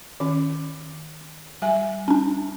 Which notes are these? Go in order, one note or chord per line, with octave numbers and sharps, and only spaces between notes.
D#3 C#4
G3 E5 G#5
C#4 D4